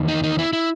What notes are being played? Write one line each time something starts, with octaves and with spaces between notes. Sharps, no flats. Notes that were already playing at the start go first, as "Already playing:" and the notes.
Already playing: E2 D#3
D#4
D#4
E4
E4